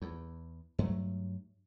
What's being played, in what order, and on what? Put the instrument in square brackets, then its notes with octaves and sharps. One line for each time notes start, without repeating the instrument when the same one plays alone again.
[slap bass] E2
G2 F#3 A3